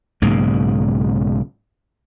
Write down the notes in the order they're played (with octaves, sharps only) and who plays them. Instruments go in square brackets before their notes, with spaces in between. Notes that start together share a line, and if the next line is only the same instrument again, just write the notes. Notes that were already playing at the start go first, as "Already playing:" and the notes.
[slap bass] B1 G#2 C#3 A#3